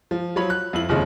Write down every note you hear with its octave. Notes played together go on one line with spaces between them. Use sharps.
F3
F3 F#3 C#5 B5
F#6
F2 E4 F#7
F1 D#2 C#3 F3 G#3 D#5